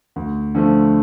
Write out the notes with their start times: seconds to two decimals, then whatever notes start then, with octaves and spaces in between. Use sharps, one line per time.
0.16 D2
0.55 D3 F3 A3